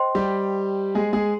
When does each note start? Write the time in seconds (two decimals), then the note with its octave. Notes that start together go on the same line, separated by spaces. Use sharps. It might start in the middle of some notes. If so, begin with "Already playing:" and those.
Already playing: C5 D#5 G5 C6
0.15 G3 G4
0.95 G#3 G#4
1.13 G#3 G#4